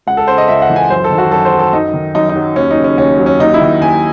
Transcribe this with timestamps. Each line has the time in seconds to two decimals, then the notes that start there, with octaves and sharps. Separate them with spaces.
0.07 C#2 F#5
0.17 A4
0.28 C#3 C5
0.38 D#5
0.48 C#2 E5
0.62 F#5
0.70 E3
0.76 G#5
0.90 F#2 C5
1.04 A4
1.11 D#3
1.18 F#4
1.31 F#2 A4
1.45 C5
1.53 F#3
1.59 A4
1.73 F#2 D#4
1.94 D#3
2.15 F#2 D#4
2.29 D#4
2.36 F#3
2.56 D#2 C#4
2.71 D#4
2.77 C#3
2.84 C#4
2.98 D#2 C#4
3.18 F#3
3.26 C#4
3.39 D#2 D#4
3.54 E4
3.61 D#3
3.81 D#2 G#5